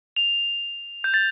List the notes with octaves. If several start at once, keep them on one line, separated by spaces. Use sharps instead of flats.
F7
G6
A6